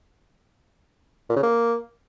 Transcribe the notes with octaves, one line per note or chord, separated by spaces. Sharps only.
A#2
C#3
A#3